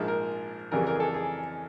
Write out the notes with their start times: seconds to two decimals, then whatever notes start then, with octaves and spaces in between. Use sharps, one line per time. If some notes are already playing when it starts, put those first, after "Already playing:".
Already playing: A#1 G#2 F3 G#3
0.08 A#4
0.72 F2 C#3 E3 G3 A#4
0.87 A#4
0.96 G#4
1.00 A4
1.14 G#4